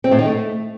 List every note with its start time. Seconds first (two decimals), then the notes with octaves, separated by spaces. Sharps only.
0.04 C4
0.11 A2
0.19 D#3
0.26 A3